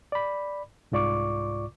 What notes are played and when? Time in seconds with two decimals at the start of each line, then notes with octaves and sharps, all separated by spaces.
0.12 D5 B5
0.92 C2 G#2 F4 D5 C#6 D6